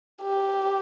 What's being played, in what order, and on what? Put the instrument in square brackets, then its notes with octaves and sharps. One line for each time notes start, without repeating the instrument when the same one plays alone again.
[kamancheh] G4